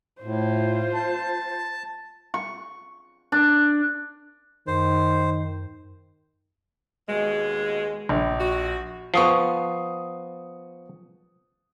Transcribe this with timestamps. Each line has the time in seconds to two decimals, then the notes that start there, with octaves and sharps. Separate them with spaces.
0.22 A2 F4 C5
0.94 A5
2.34 C#6
3.32 D4
4.67 F#2 D#3 C5
7.09 D#2 B2 G#3
8.09 A#1
8.41 F#4
9.14 F3 B3 C#6 D#6 C7